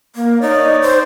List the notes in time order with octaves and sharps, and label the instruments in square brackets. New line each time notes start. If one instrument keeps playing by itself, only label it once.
[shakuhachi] A#3
[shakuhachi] D#4 [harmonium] C#5 D5
[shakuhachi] C5